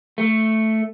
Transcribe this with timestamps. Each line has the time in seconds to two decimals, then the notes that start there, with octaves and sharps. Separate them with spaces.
0.18 A3